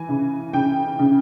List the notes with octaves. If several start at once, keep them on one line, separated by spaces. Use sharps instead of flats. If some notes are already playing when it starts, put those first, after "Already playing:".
Already playing: E3 G#5
C#3
C#3 G5
C#3